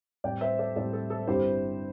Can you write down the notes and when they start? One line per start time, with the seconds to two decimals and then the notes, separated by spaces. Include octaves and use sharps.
0.24 A2 G3 C4 D5 G5
0.41 C5 E5
0.59 A4 D5
0.76 A2 G3 C4 A4 D5
0.93 A4
1.10 A4
1.27 G1 G2 G3 C4 E4 G4 C5